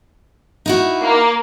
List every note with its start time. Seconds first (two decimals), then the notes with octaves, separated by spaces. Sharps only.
0.66 D#4 E4 F#4
1.04 A#3